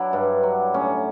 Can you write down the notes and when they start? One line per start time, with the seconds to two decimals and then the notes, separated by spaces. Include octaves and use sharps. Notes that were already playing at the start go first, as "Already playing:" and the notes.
Already playing: F#3 D4 E4
0.13 G2
0.43 F#3
0.74 A2 C#4